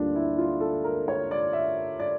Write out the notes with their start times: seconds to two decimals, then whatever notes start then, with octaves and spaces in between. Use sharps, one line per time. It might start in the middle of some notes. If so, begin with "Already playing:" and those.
Already playing: D2 D3 G3 A#3 D4 F4
0.15 E4
0.38 F4
0.61 A4
0.84 A#4
1.08 C#5
1.31 D5
1.53 E5
2.00 D5